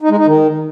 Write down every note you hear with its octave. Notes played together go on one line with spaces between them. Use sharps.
D#4
G#3
D#4
D#3